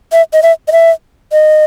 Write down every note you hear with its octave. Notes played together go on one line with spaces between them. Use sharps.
E5
D#5
E5
D#5
E5
D#5